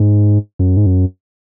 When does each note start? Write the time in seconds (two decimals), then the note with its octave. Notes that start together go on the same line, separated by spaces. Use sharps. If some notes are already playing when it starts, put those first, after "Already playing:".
Already playing: G#2
0.59 F#2
0.77 G#2
0.86 F#2